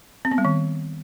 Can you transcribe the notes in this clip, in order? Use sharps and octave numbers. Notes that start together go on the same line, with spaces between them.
C4
B3
G3
D#3